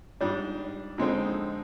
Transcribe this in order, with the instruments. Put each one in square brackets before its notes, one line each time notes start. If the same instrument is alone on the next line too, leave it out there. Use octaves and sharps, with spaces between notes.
[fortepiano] G#2 G3 D4
F2 D3 G#3 C4 D#4